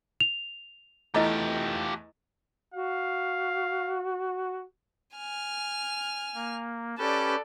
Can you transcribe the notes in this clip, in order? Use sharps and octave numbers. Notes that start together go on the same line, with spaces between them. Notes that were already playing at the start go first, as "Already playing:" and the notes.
F7
E2 E3 A3 E4 F4 G4 D#5 A#5
F#4 F5
G#5 F6
A#3
C#4 G4 A4 B4 D5